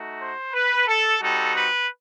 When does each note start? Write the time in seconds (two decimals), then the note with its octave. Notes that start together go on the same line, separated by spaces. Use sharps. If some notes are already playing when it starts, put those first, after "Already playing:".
Already playing: A3 D#4 F#4
0.20 C5
0.53 B4
0.87 A4
1.21 G3 C4 D#4 F#4 A4
1.55 B4